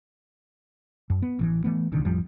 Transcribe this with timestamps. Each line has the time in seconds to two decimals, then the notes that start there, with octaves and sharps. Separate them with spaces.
1.10 F#2
1.22 B3
1.39 A1 D#3 E3
1.64 E3 A3 B3
1.92 D1 C2 D3 D#3
2.05 A1 F2 F3 G3